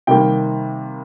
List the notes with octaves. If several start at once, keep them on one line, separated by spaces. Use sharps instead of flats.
C3 D#3 G3 A#3 G5